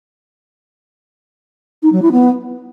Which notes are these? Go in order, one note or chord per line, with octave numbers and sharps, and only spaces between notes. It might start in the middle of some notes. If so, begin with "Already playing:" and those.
D#4
F#3
E4
B3